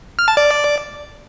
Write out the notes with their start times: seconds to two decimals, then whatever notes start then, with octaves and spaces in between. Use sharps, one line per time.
0.19 F6
0.28 A5
0.37 D5